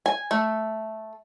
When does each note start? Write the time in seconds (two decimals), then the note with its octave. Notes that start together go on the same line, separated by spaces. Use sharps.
0.06 G#5
0.31 A3